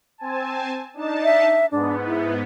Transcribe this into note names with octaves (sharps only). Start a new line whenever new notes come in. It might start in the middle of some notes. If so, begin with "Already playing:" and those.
C4 G#5 A5
D4 D#4 A5
E5
G#2 B3 D4
E4